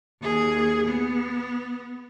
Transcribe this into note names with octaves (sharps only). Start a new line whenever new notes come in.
D#2 G#4
B3